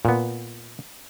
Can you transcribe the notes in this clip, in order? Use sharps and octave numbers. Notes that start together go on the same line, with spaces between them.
A#2 B3